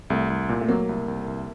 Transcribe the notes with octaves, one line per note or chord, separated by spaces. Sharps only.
C2 A3
C2
A#2
A3
F#3 A#3
C2
C2
C2